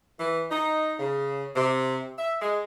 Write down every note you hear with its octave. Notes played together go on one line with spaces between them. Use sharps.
E3
D#4
C#3
C3
E5
G#3